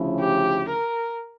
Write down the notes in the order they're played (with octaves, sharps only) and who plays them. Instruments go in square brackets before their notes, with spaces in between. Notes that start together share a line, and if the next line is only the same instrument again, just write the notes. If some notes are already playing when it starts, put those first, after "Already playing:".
Already playing: [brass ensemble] D2 C#3 F3 C#4 E4
[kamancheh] G4
A#4